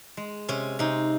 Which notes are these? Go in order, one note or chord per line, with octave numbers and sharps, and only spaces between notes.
G#3
C3 C#4
C3 D#4